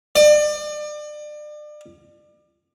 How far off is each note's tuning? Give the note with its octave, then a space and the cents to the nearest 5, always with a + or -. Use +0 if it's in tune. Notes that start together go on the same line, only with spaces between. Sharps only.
D5 +35